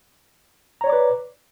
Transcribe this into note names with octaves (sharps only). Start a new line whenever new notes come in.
B4 C#5 D5 A#5 D6